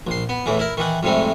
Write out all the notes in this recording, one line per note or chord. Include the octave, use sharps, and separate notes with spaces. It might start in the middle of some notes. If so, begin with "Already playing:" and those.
A#1 C6
B3
E2 A2 E3
E4 A#4
D#3 E3 F#5
F2 G#2 C3 G3 A3